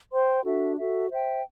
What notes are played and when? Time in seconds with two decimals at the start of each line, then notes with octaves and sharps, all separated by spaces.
0.12 C5 G5 C6
0.44 D4 F#4 A4 E5
0.76 F#4 A4 E5
1.09 C5 E5 G5